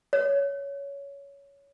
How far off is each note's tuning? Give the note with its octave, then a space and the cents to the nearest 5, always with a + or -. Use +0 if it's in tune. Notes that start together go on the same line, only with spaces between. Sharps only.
C#5 +15